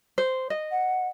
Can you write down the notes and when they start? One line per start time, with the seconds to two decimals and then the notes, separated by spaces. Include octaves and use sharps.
0.18 C5
0.50 D#5
0.71 F#5